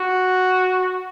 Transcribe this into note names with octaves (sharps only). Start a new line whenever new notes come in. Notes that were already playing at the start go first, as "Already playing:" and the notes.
Already playing: F#4